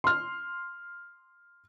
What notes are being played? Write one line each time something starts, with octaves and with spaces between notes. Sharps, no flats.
C6 F6